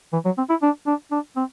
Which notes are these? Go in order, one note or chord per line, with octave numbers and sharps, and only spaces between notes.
E3
F#3
C4
E4
D4
D4
D4
C4